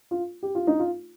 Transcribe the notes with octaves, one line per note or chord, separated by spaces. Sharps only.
F4
G4
F4
D#4
F4